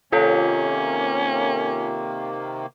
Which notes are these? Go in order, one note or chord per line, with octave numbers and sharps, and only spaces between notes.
C3 D#3 A#3 C#4 F4 A4 C#5